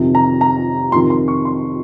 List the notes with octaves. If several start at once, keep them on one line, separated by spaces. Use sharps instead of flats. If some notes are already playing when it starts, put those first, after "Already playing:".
Already playing: F2 C3 D#3
A#5
A#5
F2 C3 D#3 C6
C6
C#6
C6